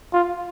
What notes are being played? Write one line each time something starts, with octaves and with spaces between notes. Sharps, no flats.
F4